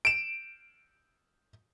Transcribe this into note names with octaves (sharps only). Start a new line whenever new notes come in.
D7 E7